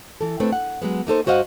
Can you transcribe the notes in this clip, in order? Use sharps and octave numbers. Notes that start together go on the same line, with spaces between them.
E3 A4
A3 C4 D4 B4
F#5
F#3 G#3 B3
A#3 D#4 A4 C5
G2 F#4 C5 D#5 F5 F#5